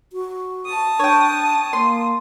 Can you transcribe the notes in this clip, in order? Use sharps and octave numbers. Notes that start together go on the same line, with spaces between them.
F#4
A5 D#6
D4 C#5 G5
A#3 C6